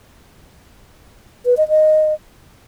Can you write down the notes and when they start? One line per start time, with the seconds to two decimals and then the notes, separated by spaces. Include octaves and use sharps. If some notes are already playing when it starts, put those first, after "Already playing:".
1.45 B4
1.57 D#5
1.69 D#5